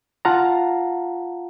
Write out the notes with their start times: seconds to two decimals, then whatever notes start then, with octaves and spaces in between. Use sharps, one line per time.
0.25 F4 F5 F#5 A5 A#5